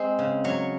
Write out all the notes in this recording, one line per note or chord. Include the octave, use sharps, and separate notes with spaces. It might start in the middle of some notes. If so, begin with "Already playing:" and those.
Already playing: G#3 C4
C#3
F#3 C#5